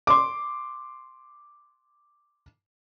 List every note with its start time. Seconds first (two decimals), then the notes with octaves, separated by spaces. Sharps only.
0.07 C6 D6